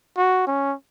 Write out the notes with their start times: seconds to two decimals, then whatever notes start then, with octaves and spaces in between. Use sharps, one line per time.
0.17 F#4
0.47 C#4